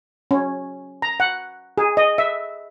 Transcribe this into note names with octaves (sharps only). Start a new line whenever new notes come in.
C#4
A#5
F#5
G#4
D#5
E5